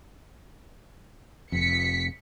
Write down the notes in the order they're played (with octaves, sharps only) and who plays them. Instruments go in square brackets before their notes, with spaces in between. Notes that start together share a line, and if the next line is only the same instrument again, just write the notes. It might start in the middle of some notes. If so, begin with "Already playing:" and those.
[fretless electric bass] F1 F2 [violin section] B6 C#7